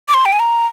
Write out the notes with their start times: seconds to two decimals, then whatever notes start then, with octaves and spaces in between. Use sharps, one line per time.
0.08 D6
0.14 C6
0.25 G5
0.32 G#5
0.39 A#5